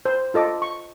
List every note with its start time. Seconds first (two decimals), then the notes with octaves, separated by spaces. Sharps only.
0.05 C5
0.34 F4 A4 D#5 D6
0.62 C#6